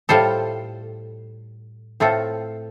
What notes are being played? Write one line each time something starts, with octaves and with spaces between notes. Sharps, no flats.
A2 G3 F4 A4 C5
A2 A3 C4 F4 A4